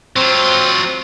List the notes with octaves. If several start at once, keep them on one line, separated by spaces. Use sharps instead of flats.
F#3 C4 F4